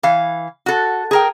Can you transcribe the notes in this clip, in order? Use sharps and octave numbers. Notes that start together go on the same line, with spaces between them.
E3 F5
F#4 A4
G#4 A#4 G5